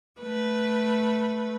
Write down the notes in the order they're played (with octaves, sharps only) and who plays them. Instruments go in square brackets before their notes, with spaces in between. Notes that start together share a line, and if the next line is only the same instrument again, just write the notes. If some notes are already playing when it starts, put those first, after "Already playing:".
[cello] A3 B4